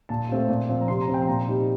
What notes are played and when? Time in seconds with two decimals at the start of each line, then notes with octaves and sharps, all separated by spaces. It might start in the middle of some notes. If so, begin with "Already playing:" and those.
0.09 A#2 A5
0.29 A3 C4 F4
0.48 A#2
0.69 F3 C4 F4
0.81 A#5
0.88 C3 C6
1.01 A#5
1.08 F3 C4 F4
1.14 G5
1.22 C6
1.27 A#2 A#5
1.48 G3 C4 D#4